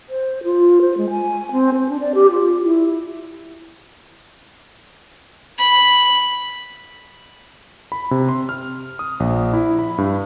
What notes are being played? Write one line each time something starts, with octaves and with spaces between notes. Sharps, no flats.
C5
F4
C5
G#3
G#5
C4
C5
D4
D5
G4
F4
E4
B5
B5
C3
C6
F6
D#6
A#1
E4
B5
G2